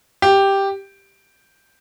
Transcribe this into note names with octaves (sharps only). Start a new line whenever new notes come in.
G4